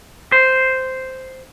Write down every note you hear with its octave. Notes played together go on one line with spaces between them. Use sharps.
C5